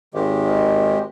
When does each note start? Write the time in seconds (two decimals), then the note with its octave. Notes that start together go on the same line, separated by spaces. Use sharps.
0.14 G#1 D#3 G#3 G4